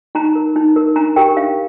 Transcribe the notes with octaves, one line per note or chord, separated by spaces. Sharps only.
D#4 A#5
A#4
D#4
A#4
D4 A#5
G4 A#4 G5
D4 F5